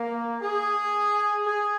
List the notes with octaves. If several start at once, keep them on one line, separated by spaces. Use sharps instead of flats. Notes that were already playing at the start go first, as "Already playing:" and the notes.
Already playing: A#3
G#4
G#4